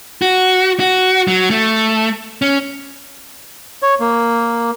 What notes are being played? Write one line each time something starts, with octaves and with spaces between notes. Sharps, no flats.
F#4
F#4
F#3
A3
C#4
C#5
A#3